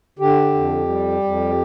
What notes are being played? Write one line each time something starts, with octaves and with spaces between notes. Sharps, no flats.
D3 G4
F2
G3
F2